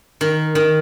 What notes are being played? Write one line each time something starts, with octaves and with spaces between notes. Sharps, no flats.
D#3
D#3